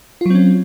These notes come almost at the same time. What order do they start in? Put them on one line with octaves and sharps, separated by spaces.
F4 F#3 C4 C#4